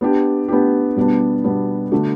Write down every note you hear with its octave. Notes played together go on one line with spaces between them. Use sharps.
B3 D4 G4
B3 D4 G4
B2 G3 B3 D4
B2 G3 B3 D4
D3 A3 D4 F#4